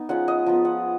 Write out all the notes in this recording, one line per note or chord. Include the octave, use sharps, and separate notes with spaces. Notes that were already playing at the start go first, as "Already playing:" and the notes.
Already playing: B3 D#4
F3 G#3 C#4 F4 F#5
D#5
F3 G#3 B3
F#5